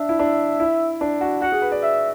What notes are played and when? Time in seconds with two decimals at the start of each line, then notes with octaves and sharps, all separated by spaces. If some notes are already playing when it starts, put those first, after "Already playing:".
Already playing: D4 E5
0.09 E4
0.19 D4
0.60 E4
1.01 D4
1.21 F#4
1.42 F#4 F#5
1.52 G#4
1.62 B4
1.72 D5
1.83 E5